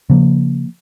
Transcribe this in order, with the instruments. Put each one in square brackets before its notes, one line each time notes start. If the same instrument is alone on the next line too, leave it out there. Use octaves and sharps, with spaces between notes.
[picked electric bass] C#3 F3 A#3